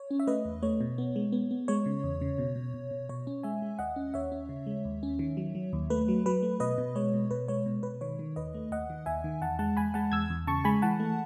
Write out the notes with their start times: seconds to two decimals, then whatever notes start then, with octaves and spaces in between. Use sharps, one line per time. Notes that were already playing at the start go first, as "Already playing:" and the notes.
Already playing: C#5
0.11 C#4
0.20 E5
0.27 A3 B4 D#5
0.45 E2
0.63 A3 C#5
0.81 B2
0.98 B3
1.16 G#3
1.32 B3
1.51 B3
1.68 G#3 C#5
1.86 C#3
2.03 E2
2.21 C#3
2.38 B2
2.56 B2
2.74 B2
2.91 B2
3.09 B2 C#5
3.27 C#4
3.43 G#3 E5 G#5
3.62 G#3
3.79 D#2 D#5 F#5
3.96 C#4
4.14 D#2 C#5 E5
4.32 C#4
4.49 C#3
4.67 G#3
4.85 D#2
5.03 C#4
5.19 D#3
5.37 F#3
5.55 F#3
5.73 D#2
5.90 A3 B4
6.08 F#3
6.26 F#3 B4
6.43 A3
6.60 B2 B4 D#5
6.78 B2
6.95 G#3 C#5
7.14 B2
7.31 B2 B4
7.48 G#3 C#5
7.66 B2
7.83 B2 B4
8.01 D#3 C#5
8.19 D#3
8.36 D#2 B4 D#5
8.54 A3
8.71 D#2 D#5 F#5
8.90 D#3
9.06 D#2 E5 G#5
9.24 D#3
9.41 E2 F#5 A5
9.59 G#3 F#5 A5
9.77 E2 G#5 B5
9.94 G#3 F#5 A5
10.12 E2 E6 G#6
10.30 E2
10.47 C#3 A5 C#6
10.64 G#3 G#5 B5
10.82 E3 F#5 A5
11.00 A3